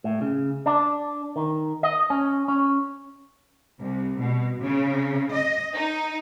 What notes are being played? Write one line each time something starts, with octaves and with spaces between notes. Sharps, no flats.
A2
C#3
D4
D#3
D#5
C#4
C#4
C2
B2
C#3
D#5
D#4